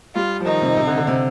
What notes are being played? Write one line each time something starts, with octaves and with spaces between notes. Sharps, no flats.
G3 F4
F3
D#3 D#4
C3
C3
D3
D3
C3